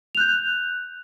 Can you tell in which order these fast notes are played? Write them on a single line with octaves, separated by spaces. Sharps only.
F7 F#6 G6